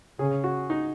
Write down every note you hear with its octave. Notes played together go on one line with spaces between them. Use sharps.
C#3 G#4
F#4
D#4